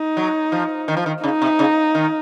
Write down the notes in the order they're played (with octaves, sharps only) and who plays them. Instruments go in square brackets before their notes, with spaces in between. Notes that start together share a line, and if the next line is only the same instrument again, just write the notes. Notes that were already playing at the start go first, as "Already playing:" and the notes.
Already playing: [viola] D#4
[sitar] F#3
F3
D#3
F3
D#3
[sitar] C#3 [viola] D#4
[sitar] C3
C#3
D#3